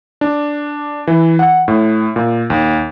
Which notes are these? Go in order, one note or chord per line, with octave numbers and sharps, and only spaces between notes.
D4
E3
F#5
A2
A#2
D#2